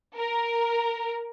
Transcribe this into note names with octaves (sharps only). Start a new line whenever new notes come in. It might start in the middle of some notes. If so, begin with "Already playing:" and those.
A#4